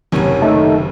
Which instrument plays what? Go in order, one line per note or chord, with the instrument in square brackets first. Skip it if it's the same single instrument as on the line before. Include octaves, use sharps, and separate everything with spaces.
[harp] F#1 C#4 [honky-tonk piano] D#2 C3
[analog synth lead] A3 [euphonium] D#4